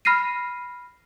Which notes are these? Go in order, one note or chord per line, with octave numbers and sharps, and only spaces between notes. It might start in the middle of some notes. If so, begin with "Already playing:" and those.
B5 F6 A#6 C7 D#7